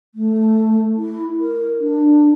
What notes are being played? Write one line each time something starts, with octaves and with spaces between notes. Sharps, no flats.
A3
E4
A#4
D4